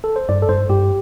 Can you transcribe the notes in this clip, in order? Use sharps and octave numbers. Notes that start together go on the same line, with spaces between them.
A4
C5
G2 D5
A4
G2 C5
G2 G4